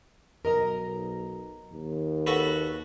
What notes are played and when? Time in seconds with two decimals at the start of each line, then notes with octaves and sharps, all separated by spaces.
0.45 B1 A#4 D#5 A#5
1.72 D#2
2.27 F#4 A4 B4